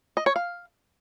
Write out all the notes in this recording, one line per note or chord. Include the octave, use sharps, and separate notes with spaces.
D#5
C#5
F5